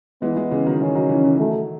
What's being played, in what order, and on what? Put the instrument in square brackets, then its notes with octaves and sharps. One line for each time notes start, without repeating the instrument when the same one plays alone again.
[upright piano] E3 G#3 [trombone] B3
[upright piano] E3 G#3
C#3 E3
D#3 F#3
[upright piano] D#3 F#3 [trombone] C#4
[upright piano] D#3 F#3
C#3 E3
C#3 E3
[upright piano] D#3 F#3 [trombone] A3